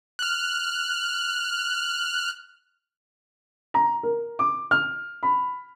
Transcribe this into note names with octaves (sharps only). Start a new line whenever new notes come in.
F6 F#6
A#5
A#4
D6
F6
B5